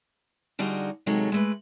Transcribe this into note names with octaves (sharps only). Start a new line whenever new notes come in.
D3 G3 D#4 F4 F#4 G#4
C3 D#3 F#3 G#3 A4 C#5
G#3 A3 B4